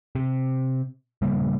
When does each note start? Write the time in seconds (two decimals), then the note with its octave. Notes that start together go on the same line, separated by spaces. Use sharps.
0.15 C3
1.22 C#3 G3 A3 A#3